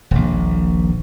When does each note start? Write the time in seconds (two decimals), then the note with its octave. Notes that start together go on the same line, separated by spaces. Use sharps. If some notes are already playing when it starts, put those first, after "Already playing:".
0.11 D#1 A#1